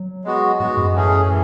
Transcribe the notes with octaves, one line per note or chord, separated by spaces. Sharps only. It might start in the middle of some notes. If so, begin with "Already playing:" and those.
Already playing: F#3
G#3 B3 F#4
G#2 G#3 B3 F#4
F#2
A2 E3 A3 C#4 G#4
A2 E3